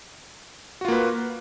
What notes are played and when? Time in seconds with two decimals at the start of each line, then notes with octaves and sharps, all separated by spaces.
0.81 F#4
0.85 F4
0.88 A#3
0.92 B4